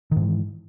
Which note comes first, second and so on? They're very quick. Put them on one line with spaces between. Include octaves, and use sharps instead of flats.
D#3 G#2 E3